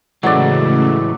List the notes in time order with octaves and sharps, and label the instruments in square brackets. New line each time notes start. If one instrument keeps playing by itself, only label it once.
[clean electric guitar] A2 E3 G#3 [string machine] C#3 A3 [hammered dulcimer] F#3 D5